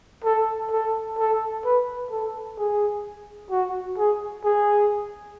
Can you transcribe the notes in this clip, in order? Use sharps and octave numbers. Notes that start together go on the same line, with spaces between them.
A4
A4
A4
B4
A4
G#4
F#4
G#4
G#4